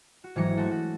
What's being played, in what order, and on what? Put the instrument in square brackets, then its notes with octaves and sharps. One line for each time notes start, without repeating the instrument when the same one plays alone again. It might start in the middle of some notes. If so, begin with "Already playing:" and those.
[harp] F#4
G#1 E3 F#3 D4 A#5 C#7
G#3 A3 F#4 A4
F#4